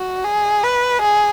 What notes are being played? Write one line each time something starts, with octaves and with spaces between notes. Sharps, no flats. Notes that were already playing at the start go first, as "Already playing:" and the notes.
Already playing: F#4
G#4
B4
G#4